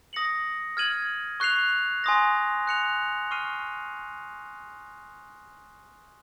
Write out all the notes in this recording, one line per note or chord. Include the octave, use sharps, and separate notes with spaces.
D#6 A#6 C#7 F#7
F6 G#6 D#7 F#7
C#6 F#6 C7 F7
G#5 C6 D#6 A#6
F#6 C#7 F7
C#6 F6 C7 D#7